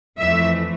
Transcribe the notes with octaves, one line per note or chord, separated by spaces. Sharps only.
F2 E3 A3 E5